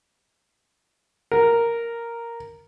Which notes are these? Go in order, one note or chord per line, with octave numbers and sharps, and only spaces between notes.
A#4